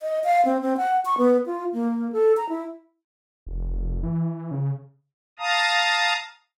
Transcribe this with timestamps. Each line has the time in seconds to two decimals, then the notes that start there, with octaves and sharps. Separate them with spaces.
0.02 D#5
0.24 F5
0.45 C4
0.62 C4
0.77 F#5
1.05 C#6
1.18 B3
1.46 F4
1.74 A#3
2.13 A4
2.37 A#5
2.49 E4
3.47 F1
3.67 F1
4.03 E3
4.51 C#3
5.39 F5 A5 A#5 D#6